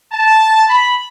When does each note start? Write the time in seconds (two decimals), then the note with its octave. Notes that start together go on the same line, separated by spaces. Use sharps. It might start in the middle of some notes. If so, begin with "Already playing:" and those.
0.13 A5
0.69 B5